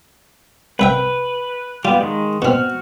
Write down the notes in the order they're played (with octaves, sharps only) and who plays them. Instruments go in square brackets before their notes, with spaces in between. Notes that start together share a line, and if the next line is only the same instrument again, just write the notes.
[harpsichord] C2 E5 G5 [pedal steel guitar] B4
[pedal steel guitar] G3 B3 [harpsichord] F4
[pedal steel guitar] D#3 G#3
[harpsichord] B2 C4 [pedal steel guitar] F#4 F6